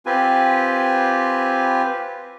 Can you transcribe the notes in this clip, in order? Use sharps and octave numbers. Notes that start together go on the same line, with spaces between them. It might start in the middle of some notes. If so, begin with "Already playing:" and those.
C4 F4 G4 B4 G#5